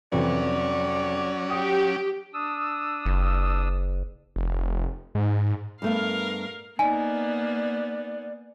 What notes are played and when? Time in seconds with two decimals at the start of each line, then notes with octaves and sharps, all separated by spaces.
0.12 F2 C3 E3 F#3 C#4 D5
1.50 G4 D#6
2.34 D4 D#6 E6
3.06 F#1
4.36 F1
5.15 G#2
5.82 G2 A3 B3 A#4 F5
6.79 A#3 B3 D#4 D5 G#5